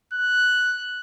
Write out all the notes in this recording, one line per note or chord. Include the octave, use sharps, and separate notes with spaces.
F#6